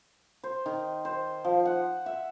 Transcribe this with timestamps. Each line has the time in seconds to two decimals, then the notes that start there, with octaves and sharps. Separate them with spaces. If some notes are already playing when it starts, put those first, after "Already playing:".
0.44 C5
0.66 D#3
1.05 C5
1.45 F3
1.65 F#5
2.06 E5